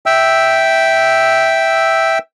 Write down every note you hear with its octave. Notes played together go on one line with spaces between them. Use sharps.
E5 G5 E6